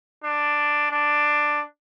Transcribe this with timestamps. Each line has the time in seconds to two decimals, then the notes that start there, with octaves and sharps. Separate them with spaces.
0.24 D4
0.91 D4